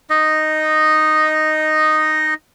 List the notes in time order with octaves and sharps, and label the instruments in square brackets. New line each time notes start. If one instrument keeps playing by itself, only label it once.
[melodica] D#4 D#5